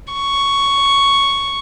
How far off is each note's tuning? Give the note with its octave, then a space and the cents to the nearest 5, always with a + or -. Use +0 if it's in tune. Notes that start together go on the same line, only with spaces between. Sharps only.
C#6 +5